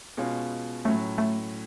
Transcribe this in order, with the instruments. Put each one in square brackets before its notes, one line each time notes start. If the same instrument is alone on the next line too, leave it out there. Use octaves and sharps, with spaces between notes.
[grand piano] B2 G#3 C#4 F4
[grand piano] A2 F#3 C#4 [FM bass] A3
[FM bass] A3